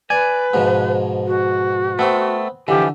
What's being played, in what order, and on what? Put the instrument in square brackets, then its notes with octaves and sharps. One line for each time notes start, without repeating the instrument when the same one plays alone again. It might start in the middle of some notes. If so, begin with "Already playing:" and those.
[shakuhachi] B4 [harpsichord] D5 [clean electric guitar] G#5
[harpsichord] G#2 B2 F3
[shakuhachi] F#4
[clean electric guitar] A3 [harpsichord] B3 C4 C6
[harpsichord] D3 [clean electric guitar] E3 F3 [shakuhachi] G4